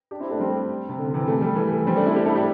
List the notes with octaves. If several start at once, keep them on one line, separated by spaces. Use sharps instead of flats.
D4 G4
C4 E4
A3 D4
G3 C4
C3
D3
C3 E3
A3
G3
E3 A3
G3 C4
A3 D4
C4 E4
D4 G4
E4 A4
D4 G4